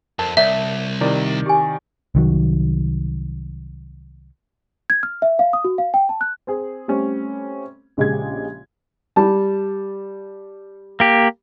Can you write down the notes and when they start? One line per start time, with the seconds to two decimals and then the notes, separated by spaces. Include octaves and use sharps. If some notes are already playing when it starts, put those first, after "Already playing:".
0.19 F2 A#4 A5
0.37 C2 A#4 C#5 D5 E5
1.01 C3 D#3 E4 F4 A#4 D5
1.46 G4 G#5
2.15 C2 D#3 F#3
4.90 G#6
5.03 F6
5.22 E5
5.39 F5
5.53 D#6
5.64 F#4
5.78 F5
5.94 G5
6.09 A5
6.21 F#6
6.47 C4 G#4
6.88 G3 A3 C4 C#4
7.97 A#1 C#3 G#3 G4 G#4 G#6
9.16 G3 A5
11.00 A#3 G4